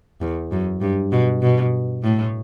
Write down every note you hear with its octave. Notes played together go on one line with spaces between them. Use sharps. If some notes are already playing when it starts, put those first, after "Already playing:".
E2
F#2
G2
B2
B2
A2